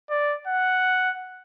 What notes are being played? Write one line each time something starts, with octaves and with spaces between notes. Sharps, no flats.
D5
F#5